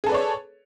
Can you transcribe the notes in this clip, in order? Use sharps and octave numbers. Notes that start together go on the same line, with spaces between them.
G#4 A4 B4 C#5 D5